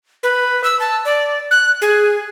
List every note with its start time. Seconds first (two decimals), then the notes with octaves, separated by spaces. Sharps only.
0.23 B4
0.64 E6
0.79 A5
1.05 D5
1.51 F#6
1.81 G#4